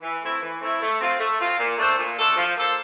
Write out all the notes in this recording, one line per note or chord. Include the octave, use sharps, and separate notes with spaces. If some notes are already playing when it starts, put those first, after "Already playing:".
E3
A3 C4 E4
E3
A3 C4 E4
A3
C4 F4
A3
C4 F4
A#2
A3 D4 A4 C5
A#2
A3 D4 A4 C5
F3
A#3 F4 A4 C5